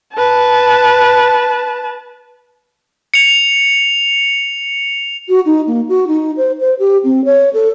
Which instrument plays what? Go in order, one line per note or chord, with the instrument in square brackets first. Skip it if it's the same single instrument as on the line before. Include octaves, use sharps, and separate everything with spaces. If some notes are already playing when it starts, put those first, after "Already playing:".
[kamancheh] B4 A5
[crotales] C#7 F7
[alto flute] F#4
D#4
A#3
F#4
D#4
C5
C5
G4
C4
C#5
A4